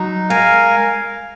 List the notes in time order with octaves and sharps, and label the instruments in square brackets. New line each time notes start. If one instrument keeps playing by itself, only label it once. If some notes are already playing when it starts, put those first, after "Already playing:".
Already playing: [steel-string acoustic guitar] F#3 [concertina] D#4
[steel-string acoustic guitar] G#3 [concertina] A#4 F5 G#5